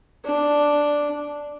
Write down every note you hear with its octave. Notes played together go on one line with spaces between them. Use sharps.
D4